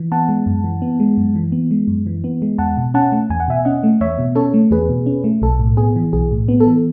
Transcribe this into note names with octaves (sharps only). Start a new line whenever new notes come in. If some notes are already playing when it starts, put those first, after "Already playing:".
Already playing: E3
B3 F#5 A5
G#3
F#2
E3
B3
G#3
F#2
E3
B3
G#3
F#2
E3
B3
G#3
E2 F#5 A5
B2
C#4 F#5 A5
A3
E2 G#5
F#5
B2 E5 G#5
C#4 D#5 F#5
A3
E2 C#5 E5
B2
C#4 A4 C#5
A3
E2 G#4 B4
B2
C#4
A3
B1 A4
A2
B3 G#4
E3
B1 G#4
A2
B3
A4
E3